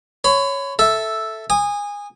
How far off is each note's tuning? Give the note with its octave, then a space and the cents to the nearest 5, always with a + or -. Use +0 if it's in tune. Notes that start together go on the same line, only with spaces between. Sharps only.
C#5 +0 B5 +35
A4 +0 E5 +0
G#5 -20 D#6 -15